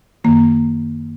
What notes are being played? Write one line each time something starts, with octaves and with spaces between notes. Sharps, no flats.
F#2 D#3 A#3